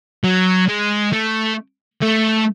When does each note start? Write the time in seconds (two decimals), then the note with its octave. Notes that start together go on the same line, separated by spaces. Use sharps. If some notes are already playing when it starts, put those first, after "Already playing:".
0.24 F#3
0.68 G#3
1.13 A3
2.02 A3